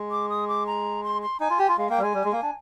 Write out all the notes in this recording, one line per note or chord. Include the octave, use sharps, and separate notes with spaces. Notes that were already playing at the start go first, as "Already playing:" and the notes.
Already playing: G#3
D6
D#6
D6
A#5
C6
C6
D#4 G#5
F4
G4
F4
G#3 F5
A#3 G5
G3
G#3 G#5
G3
G#3
A#3
D4